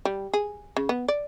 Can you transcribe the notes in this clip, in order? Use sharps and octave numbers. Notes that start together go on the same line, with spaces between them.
G3
G#4
C#3
B3
D5